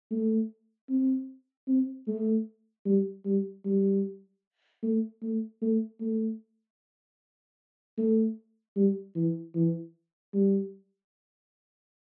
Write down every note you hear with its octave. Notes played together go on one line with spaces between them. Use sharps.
A3
C4
C4
A3
G3
G3
G3
A3
A3
A3
A3
A3
G3
E3
E3
G3